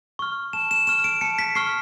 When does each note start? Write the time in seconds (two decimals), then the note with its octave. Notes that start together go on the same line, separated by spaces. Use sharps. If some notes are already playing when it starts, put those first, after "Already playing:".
0.19 C#6 F6
0.53 A5 E7
0.71 E7
0.87 C#6 F6 E7
1.04 D7
1.21 A5 C#7
1.39 B6
1.55 C#6 F6 C7